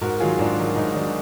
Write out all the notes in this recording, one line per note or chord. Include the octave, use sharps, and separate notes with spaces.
G#2 F#4 A#4
D#3 F#3 F4 G#4
G#2 D4 F4
D#3 F#3
G#2 D#4
D#3 F#3 D4